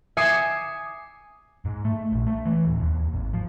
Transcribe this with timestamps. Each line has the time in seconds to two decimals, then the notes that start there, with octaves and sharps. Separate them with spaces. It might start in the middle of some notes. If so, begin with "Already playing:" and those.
0.17 E5 G#5 D6 D#6 C7 C#7
1.65 G#2
1.85 A3
2.12 A#1
2.27 A3
2.46 E3
2.65 D1
2.81 D#2
3.13 G#1
3.34 F3